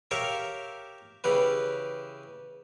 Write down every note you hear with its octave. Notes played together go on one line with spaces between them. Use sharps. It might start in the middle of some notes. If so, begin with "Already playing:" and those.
G4 A#4 C#5 E5 F5
C#3 E3 G4 B4